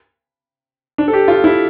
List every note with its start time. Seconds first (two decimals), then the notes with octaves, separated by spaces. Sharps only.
0.98 D4
1.08 A4
1.13 G4
1.28 F4
1.44 E4